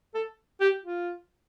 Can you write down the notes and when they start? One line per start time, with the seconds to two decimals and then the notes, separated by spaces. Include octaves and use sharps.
0.15 A4
0.61 G4
0.84 F4